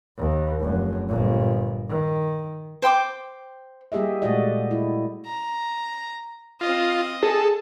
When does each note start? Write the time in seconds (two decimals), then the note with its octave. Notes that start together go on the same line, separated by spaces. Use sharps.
0.18 D#2
0.61 F1 F#2
1.08 G1 A#2
1.89 D#3
2.82 C5 G5 C6 D6
3.92 G3 A#3 G4 G#4 D#5 E5
4.22 A#2 G#3 A3 F#4 D5 D#5
4.71 E4
5.26 A#5
6.61 C4 F4 D#5
7.23 G#4 A4